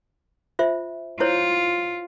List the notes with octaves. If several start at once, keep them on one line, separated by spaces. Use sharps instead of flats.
F4 C5 E5
E4 F4 C5 C#5